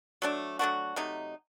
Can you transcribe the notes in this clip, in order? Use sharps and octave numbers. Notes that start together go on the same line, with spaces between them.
F#3 A3 D4
F#3 A3 D4 F#4
C3 F#3 A3 D#4